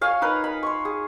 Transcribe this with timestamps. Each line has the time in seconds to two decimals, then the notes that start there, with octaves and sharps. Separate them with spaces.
0.01 C#5 F5 G#5
0.22 D#4 A#4 B4
0.44 B5
0.63 C6 C#6
0.85 G#4